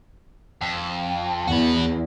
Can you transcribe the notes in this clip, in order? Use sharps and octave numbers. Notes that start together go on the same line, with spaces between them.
F2
E2 F#4 B4